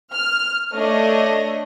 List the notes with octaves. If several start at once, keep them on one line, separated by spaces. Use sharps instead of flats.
F6
A3 D4 C#5 D#5